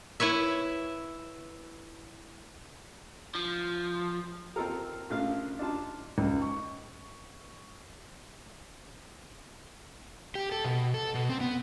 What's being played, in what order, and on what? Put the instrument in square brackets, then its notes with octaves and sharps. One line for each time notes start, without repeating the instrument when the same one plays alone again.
[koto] E4 B4 C#5 E5
[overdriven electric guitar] F3
[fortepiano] C4 D#4 F4 A4 A#4
A#1 C#3 A3 F4 F5
D4 D#4 F4 A5
[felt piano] C#2
C#6
[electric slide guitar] G4
A4
B2
A4
B2
C4
B3